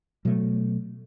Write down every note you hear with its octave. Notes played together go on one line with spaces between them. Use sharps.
B2 F#3 A3